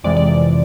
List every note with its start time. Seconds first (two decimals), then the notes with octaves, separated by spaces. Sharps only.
0.04 F2 C3 E3 G#3 D5
0.17 D5